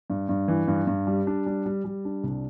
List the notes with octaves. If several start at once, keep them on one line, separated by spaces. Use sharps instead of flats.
G2
G2
E3
G2
G2
G3
D4
G3
G3
G3
D4
C2